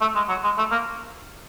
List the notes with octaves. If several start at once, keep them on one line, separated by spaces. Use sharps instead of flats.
A3
G#3
F#3
G#3
A3
A#3